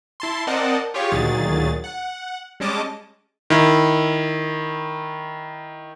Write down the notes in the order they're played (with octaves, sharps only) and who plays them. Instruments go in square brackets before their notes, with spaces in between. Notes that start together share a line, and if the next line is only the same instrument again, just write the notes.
[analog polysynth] E4 A5 C6
C4 A#4 D5 D#5 F#5 A5
F4 G4 G#4 C#5
D2 A#2 D#3 F#3 G#4 A6
F#5
G3 G#3 C#4 D#5 A5 D6
[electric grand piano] D#3 E4